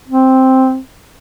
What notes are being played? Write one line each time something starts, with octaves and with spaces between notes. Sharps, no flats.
C4